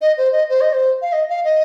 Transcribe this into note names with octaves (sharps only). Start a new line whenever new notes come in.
D#5
C5
D#5
C5
D#5
C5
F5
D#5
F5
D#5